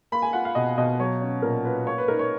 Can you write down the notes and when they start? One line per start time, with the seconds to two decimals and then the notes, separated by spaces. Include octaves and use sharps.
0.12 A#3 B5
0.22 G#5
0.33 F4 F#5
0.45 F5
0.55 B2 D#5
0.78 B2 D#5
1.00 F#3 C#5
1.21 C#4
1.42 A#2 A#4
1.65 F4 B4
1.86 A#3 C#5
1.98 B4
2.08 D#4 A#4
2.19 C#5